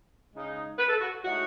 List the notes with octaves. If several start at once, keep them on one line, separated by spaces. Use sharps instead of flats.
C#3 G#3 D#4
B4
A4
F#4
A2 G#3 D#4 F#4